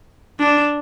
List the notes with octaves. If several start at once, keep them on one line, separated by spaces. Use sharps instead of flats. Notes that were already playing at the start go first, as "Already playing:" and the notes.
D4